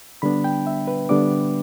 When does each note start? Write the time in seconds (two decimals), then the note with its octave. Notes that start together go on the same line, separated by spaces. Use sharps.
0.22 D3 G3 B3 D4 B5
0.44 G5
0.67 E5
0.87 B4
1.09 D3 G3 B3 D4 D6